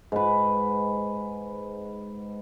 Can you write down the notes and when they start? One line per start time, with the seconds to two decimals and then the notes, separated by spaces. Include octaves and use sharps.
0.12 G#2 B4